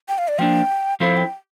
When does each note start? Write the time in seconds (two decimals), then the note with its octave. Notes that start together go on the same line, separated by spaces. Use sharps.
0.09 G5
0.18 F5
0.28 D5
0.39 F3 A#3 D4 G5
1.00 F3 C4 E4 A4 C5 F5
1.17 G5